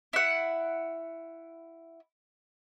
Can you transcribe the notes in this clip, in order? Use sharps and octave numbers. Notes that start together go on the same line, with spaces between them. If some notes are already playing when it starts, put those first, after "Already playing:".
E4 F#5